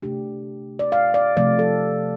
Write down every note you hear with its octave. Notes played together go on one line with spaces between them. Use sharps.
C3 A3 D4 G4
D5
F5
D5
C3 F3 A3 D5
A4